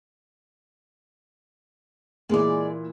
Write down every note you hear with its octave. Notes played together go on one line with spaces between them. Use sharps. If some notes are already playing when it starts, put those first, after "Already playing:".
A#2 E3 G#3 D5